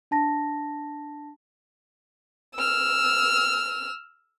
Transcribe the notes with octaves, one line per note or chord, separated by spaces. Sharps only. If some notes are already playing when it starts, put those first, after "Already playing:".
D4 A5 A#6
E6 F6